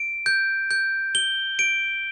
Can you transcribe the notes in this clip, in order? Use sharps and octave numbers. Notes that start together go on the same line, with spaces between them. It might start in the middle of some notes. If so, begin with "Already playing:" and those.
Already playing: D7
G6
G6
G7
D7